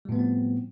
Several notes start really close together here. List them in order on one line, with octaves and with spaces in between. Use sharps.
G3 A2 B3 F3 C4